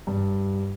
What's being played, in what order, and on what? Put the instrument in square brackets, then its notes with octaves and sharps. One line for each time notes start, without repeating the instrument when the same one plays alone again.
[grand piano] G2